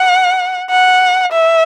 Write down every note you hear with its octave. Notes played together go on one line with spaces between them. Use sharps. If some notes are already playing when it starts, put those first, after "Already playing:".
Already playing: F#5
F#5
E5